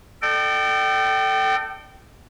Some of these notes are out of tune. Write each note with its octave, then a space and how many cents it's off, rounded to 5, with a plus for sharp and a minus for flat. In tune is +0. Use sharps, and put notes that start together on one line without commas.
A4 +0 D5 +45 G5 -25